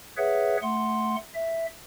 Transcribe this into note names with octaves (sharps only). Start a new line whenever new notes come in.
G#4 B4 C#5 E5 F#5
A3 F#5 C6
E5